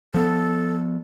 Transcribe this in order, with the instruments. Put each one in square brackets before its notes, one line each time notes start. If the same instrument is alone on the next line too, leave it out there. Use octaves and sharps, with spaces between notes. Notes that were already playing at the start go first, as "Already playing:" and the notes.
[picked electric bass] F3 B3 [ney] A4